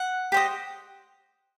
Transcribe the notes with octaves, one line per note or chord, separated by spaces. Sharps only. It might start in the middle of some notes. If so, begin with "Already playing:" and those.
Already playing: F#5
G4 C5 D#5